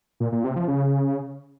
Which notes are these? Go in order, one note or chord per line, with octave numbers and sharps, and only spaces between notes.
A#2
A#2
C3
F3
C#3